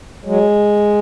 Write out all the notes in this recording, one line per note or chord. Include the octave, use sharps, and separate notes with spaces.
F#3 G#3